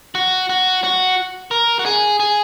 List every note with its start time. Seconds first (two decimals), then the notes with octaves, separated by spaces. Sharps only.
0.15 F#4
0.49 F#4
0.84 F#4
1.51 A#4
1.79 F#4
1.86 G#4
2.20 G#4